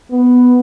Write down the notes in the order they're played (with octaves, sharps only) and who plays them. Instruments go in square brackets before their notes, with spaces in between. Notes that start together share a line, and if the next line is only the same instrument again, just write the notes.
[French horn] B3